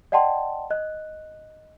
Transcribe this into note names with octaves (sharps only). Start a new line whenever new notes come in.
D5 D#5 F#5 G5 A5 C6
D#5 F#6